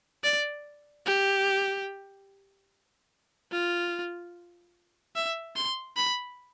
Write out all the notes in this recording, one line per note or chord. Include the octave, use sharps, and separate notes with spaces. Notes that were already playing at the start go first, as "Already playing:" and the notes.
D5
G4
F4
E5
C6
B5